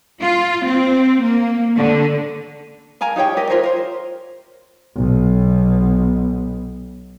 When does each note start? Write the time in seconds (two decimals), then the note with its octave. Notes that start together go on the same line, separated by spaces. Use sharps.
0.22 F4
0.66 C4
1.23 A#3
1.77 D3
3.01 A#4 F5 G#5 A#5
3.16 D#4 G4 C#5 G5
3.37 G4 A#4 D#5
3.50 F4 A#4 C5 C#5
3.63 A#4 C5
4.95 B1 B2